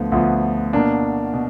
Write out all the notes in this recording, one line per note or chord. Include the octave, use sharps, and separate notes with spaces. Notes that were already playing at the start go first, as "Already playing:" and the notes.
Already playing: D2 D3 F3 B3
D2 D3 F3 B3
B2 A#3 D4
B2